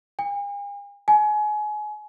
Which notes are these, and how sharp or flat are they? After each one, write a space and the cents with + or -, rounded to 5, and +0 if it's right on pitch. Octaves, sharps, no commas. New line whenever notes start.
G#5 -45
G#5 +25